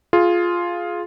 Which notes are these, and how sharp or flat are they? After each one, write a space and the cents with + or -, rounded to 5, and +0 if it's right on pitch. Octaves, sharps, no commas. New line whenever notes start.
F4 +0 G#4 +15